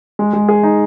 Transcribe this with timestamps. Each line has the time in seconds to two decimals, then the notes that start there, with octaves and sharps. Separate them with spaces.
0.19 G#3
0.33 G#3
0.49 G#4
0.63 D#4